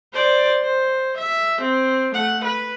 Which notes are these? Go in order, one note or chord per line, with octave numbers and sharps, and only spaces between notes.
C5 D5
C5
E5
C4
A3 F#5
B4